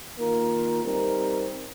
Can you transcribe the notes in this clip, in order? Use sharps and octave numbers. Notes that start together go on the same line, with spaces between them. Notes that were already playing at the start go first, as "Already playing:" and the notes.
D#3 A#3 F4 A#4
G3 C4 D#4 A#4